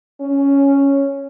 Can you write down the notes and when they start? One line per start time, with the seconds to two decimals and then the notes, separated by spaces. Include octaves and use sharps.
0.21 C#4